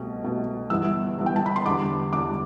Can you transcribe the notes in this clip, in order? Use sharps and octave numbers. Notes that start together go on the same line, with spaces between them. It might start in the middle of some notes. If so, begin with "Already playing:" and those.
Already playing: C2 B2 A3
C2 B2 A3
G1 G2 E3 B3 E6
G1 G2 E3 B3
G5
A5
B5
C6
E2 D3 G3 D4 D6
E2 D3 G3 D4 D6